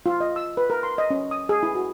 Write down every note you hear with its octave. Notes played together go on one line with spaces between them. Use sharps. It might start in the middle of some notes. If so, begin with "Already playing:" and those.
F4
D#5
E6
B4
A#4
C6
D#5
C#4
D#6
G#4
E4
F#4